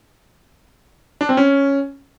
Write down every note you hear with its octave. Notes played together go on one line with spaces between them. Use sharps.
D4
C4
C#4